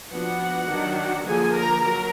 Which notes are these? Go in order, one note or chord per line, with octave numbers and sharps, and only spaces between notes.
F3 B3 D4 F#4 F#5
D#3 F#3 D4
D3 F3 A#3 G#4 G#5
A#4 A#5
F#3 A#4 A#5